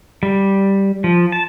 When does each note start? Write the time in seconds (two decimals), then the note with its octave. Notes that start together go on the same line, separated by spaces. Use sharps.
0.23 G3
1.04 F3
1.32 A5